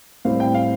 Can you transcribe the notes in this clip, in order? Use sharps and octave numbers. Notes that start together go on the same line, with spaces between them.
A2 G3 C4 F5
G5
F5